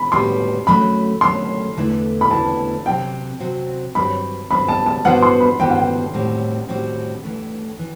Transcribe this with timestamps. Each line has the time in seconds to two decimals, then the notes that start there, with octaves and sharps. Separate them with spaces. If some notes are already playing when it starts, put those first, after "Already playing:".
Already playing: B5
0.12 A2 G3 B3 F#4 C6
0.67 F#2 F#3 A3 B5
1.21 F#2 F#3 A3 C6
1.77 E2 D3 A3 E4 B4
2.21 B5
2.30 E2 D3 A3 E4 B4 A5
2.86 C3 F#3 C4 F#4 G5
3.40 C3 F#3 C4 F#4
3.95 G2 F#3 C4 B5
4.50 G2 F#3 C4 B5
4.68 A5
4.86 A5
5.05 G2 E3 B3 F#4 C5 F#5
5.23 C6
5.41 B5
5.59 G2 E3 B3 F#4 C5 G5
5.70 F#5
5.79 G5
6.14 A2 G3 C4 F#4
6.69 A2 G3 C4 F#4
7.24 G2 E3 A3
7.79 E3